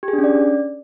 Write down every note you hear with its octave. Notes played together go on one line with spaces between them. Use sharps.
G4
G#4
D4
C#4
D5